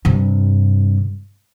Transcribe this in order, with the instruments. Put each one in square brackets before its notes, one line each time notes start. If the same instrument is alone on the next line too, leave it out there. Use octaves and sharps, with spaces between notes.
[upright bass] G2 C3